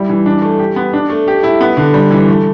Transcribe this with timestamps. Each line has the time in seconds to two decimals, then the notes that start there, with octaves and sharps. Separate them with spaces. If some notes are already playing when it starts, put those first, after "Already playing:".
Already playing: G3 E4
0.09 E3
0.26 D4
0.42 A3
0.59 G4
0.76 B3
0.93 D4
1.10 A3
1.28 G4
1.43 E4
1.61 B3
1.77 D3
1.94 G3
2.11 E3
2.28 A3